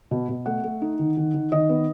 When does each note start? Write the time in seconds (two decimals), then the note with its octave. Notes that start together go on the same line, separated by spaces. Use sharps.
0.11 B2
0.29 B2
0.46 A3 F#5
0.64 A3
0.82 D#4
0.99 D#3
1.17 D#3
1.34 D#3
1.52 D#3 D#5
1.69 B3